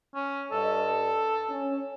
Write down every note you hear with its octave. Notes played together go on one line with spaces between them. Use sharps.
C#4
G2 A4 D#5
C#4